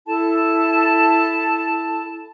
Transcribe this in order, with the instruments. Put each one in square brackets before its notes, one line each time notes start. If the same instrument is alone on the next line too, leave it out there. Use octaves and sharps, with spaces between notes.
[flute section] E4 A4 A5